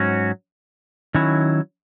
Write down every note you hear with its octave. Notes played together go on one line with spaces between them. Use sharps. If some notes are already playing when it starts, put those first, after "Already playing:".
Already playing: G#2 F#3 C#4 F#4
D#3 F#3 C#4 E4